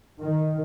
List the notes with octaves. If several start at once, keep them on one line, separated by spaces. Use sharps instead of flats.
D#3